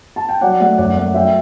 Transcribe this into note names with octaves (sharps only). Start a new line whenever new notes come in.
A5
G5
F#3 D5 F#5
A3 D5 F#5
F#2 D5 F#5
A3 D5 F#5
F#3 E5 G5